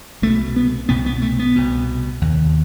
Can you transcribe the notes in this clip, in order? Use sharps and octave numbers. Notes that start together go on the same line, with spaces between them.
C2 B2 A3
B3
C2 B2 B3
B3
A3
B3
C2 B2
D#2